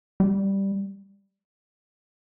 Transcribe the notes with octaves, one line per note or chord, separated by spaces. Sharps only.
G3